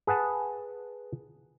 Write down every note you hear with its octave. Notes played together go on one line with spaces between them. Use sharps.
G#4 B4 F#5 A5